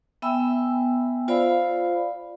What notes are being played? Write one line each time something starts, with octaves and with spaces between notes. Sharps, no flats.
B3 E5 G5 G#5 B5 E6
F4 C5 D5 F5 B5